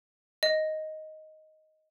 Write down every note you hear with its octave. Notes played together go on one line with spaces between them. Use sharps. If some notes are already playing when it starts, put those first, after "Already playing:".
D#5